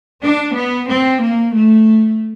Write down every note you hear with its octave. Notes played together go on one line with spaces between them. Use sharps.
D4
B3
C4
A#3
A3